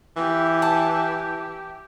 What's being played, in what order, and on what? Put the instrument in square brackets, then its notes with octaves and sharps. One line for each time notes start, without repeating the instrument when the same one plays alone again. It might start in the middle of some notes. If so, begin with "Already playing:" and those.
[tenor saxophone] E3 [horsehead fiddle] G4
[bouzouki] A5